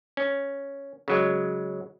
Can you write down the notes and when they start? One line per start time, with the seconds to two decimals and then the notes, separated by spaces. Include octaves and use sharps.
0.17 C#4
1.08 C#3 F#3 G#3